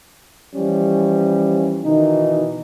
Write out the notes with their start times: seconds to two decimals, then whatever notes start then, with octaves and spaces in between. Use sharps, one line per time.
0.55 E3 F3 G3 C#4
1.85 B2 D#3 E3 D#4